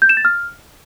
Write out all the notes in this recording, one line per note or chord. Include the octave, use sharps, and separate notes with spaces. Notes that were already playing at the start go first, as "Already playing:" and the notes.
G6
E7
A6
F6